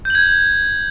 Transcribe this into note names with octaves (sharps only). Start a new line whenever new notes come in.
G6 G#6 F#7